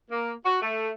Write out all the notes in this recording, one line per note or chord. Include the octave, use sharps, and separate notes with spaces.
A#3
F#4
A3